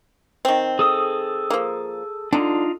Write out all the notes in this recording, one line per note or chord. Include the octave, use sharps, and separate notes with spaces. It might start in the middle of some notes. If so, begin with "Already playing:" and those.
D#3 C4
G#4 A4 D#6
F3 A#3
D3 D4 D#4 F4